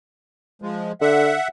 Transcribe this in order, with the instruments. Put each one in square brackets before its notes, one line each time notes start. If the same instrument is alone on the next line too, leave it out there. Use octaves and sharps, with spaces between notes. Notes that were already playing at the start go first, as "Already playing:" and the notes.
[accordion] F3 G#3
[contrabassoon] D3 [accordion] E5 F#5